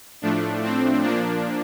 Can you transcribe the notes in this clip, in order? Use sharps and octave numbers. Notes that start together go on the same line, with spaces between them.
A2 F3 A3 D4
C4
A#2 F3 A#3 D4